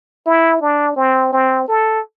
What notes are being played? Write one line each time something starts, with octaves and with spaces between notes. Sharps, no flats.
E4
D4
C4
C4
A4